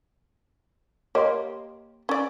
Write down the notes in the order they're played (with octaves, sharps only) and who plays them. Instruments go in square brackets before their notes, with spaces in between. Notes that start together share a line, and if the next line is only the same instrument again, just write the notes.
[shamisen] A#3 G4 [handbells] C#5 D#5 C6
[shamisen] C#4 D5